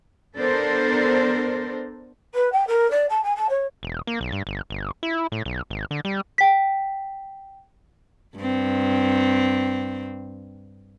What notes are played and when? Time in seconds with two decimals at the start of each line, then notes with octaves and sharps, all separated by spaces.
0.38 B3 D4 A4 A#4 C5
2.34 B4
2.52 G5
2.67 A#4
2.90 D5
3.09 A5
3.23 G#5
3.35 A5
3.49 C#5
3.83 E1
4.07 A#3
4.21 B1
4.32 G2
4.47 G1
4.70 G1
5.03 E4
5.32 A2
5.45 B1
5.70 G#1
5.91 D3
6.05 G3
6.38 G5 B6
8.38 G2 C4